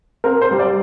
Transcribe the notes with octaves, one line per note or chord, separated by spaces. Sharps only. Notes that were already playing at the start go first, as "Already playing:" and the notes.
C4 A#4
C5
G3
D5